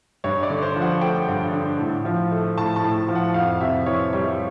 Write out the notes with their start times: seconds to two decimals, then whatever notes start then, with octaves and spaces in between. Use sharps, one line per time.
0.24 G2 C#5
0.43 D5
0.50 D3
0.62 C5
0.76 F3
0.82 F#5
1.01 A3 G5
1.28 G2
1.53 D3
1.79 A2
2.05 F3
2.31 A3
2.57 A2 A5
2.76 A5
2.83 A2
3.09 F3
3.15 F#5
3.34 F2 F5
3.60 C3 E5
3.86 E3 C#5
4.13 G3 C#5